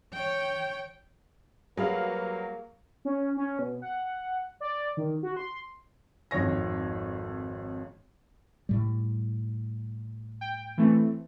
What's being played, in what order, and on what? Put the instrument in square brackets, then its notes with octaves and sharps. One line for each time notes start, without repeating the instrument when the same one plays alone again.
[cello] C#5 G5
[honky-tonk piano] F#3 F5 [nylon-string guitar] G3 B4 [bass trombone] A#3 [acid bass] G#4
[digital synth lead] C#4
C#4
B2
F#5
D5
D#3
F#4
C6
[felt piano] G#1 F2 D#3 C#5 A#6
[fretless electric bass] A2 G3
[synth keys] G5
E3 A3 C4